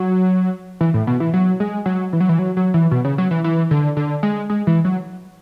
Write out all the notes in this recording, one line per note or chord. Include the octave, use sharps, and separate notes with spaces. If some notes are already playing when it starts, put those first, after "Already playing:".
Already playing: F#3
E3
A2
B2
E3
F#3
G#3
F#3
E3
F#3
E3
F#3
F#3
E3
B2
C#3
F#3
E3
E3
D3
D3
G#3
G#3
E3
F#3